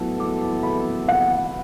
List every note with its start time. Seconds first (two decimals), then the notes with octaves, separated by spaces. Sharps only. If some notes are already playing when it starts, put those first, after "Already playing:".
Already playing: A2 F#3 B3 E4 A4
0.20 D6
0.63 B5
1.08 F#5